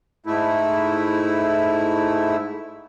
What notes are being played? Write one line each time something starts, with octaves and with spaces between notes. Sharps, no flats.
G#2 A3 E4